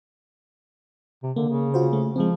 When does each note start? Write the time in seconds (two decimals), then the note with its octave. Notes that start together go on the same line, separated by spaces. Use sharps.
1.23 C3
1.36 D3 A#3
1.49 C#3
1.74 F4 F#4 C5
1.93 A3
2.16 F3 G#3 C4